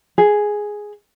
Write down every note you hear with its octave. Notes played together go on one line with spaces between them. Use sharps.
G#4